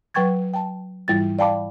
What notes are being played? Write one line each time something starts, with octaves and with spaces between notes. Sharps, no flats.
F#3 B4 G5 C#6 G#6 A6
G5 A5
G#2 E3 G3 E4 F4 A6
D5 F5 G5 A5 B5 D6